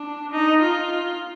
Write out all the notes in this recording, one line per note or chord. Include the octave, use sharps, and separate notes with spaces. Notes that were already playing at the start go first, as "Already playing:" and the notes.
Already playing: D4
D#4
F4